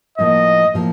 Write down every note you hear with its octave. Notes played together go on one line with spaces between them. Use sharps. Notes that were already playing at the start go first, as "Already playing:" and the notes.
A2 F3 A#3 D#5
A2 F3 A#3